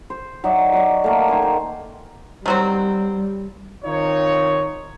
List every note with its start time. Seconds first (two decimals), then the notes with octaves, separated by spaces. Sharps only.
0.10 C5
0.44 F#3 D#4 D5 E5
0.73 F#3 D5
1.04 A3 A#3
1.29 D#3 C5 G#5
1.42 C5
2.46 D#3 F#3 G3 C4
3.84 D#3 C4 D#4 F4 C#5